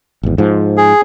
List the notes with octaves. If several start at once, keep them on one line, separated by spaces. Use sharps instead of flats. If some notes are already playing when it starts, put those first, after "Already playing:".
G#1 E2
G#2 F3
G#4